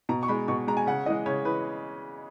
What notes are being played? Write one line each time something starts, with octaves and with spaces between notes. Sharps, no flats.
B2 A#5
C#6
G#3 B5
B2 C#6
G#3 A#5
G#5
C#3 F#5
E3 G#3 D#5
C#3 C#5
E3 B4